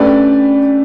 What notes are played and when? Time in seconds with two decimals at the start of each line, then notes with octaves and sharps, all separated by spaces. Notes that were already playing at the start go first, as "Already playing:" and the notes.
Already playing: A3 C#4 D4 G4 B4 D5